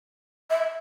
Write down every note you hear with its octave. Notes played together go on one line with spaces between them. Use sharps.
E5